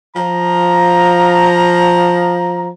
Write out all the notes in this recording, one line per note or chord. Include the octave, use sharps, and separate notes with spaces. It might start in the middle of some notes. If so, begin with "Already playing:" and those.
F3 A#5